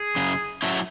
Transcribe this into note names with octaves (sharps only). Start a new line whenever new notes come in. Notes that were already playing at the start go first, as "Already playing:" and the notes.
Already playing: G#4
F#2 C#3
F#3 A3 C#4 E4